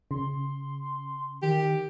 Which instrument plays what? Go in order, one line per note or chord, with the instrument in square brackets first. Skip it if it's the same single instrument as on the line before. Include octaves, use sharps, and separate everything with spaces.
[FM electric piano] C#3 [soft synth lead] C6
[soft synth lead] D#3 [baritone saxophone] G4